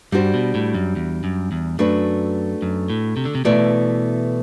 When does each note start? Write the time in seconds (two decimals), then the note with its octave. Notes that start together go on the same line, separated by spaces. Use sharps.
0.12 G2 G3 D4 F#4 C5
0.34 B2
0.55 A2
0.74 F#2
0.96 E2
1.24 F#2
1.52 E2
1.79 F#2 A3 D4 F#4 B4
2.62 F#2
2.90 A2
3.17 C3
3.25 D3
3.35 C3
3.45 B2 E3 A3 E4 B4 D5